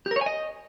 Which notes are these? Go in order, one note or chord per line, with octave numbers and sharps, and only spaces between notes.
G4
A#4
C#5
G#5
D#5